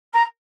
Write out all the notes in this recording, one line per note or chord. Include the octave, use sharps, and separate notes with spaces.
A#5